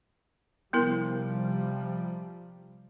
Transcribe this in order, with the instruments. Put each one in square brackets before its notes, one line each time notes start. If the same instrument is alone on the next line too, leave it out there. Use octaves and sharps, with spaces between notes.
[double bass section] C3 F3 G3 [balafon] B3 E4 A#4